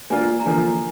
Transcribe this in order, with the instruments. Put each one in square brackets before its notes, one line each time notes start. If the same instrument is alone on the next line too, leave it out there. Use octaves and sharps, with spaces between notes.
[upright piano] A#3 D4 F4 A#4 [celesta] G#5
[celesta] A#5
[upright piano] D3 F3 A#3 F4 [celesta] G#5